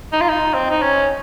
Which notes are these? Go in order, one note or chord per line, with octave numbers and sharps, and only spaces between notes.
D#4
F4
D#4
C4
D#4
C#4